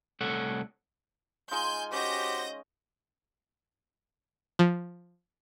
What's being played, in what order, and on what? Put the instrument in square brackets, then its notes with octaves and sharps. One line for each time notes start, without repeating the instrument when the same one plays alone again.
[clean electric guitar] C2 A3 A4 C#5 F#5
[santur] G#3 D#4 F4 [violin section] G#5 G6
[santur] C#4 [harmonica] F#4 C5 [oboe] G4 [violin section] D#5 G6 A#6
[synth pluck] F3